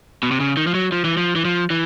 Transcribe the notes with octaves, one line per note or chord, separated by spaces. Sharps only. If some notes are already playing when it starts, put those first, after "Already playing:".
B2
C3
C#3
D#3
F3
F#3
F3
E3
F3
E3
F3
E3